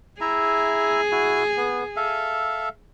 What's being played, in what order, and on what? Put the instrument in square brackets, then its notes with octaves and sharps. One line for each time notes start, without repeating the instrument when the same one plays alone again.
[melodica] E4 E5 A#5 [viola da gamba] G#4
[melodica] E4 F#4
B3
A4 E5 F5